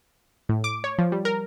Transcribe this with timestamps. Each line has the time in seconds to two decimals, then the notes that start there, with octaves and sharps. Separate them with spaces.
0.49 A2
0.64 D6
0.84 C#5
0.98 F3
1.12 G3
1.25 A#4